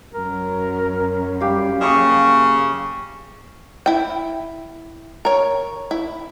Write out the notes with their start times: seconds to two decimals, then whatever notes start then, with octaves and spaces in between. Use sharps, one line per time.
0.13 F#2 F#3 C#4 A#4
1.41 G3 G4 F5
1.81 C#3 A#3 E5 C#6 D#6
3.86 E4 G5
5.25 A#4 C#5
5.91 E4